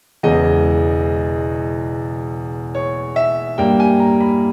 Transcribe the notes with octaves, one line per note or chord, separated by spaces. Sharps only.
E1 E2 C#3 G#3 D#5
C#5
E5
G2 G3 A#3 G5
G#5
A#5
B5